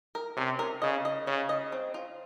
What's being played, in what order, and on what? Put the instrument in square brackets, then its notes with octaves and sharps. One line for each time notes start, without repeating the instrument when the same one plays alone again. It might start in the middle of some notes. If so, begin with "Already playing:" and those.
[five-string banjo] A#4
[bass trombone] C3 [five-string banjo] C#4
[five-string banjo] A#4
[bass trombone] C#3 [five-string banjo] D#5
[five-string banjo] D#5
[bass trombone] C#3 [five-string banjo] C#4
[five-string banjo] D#5
C4
F4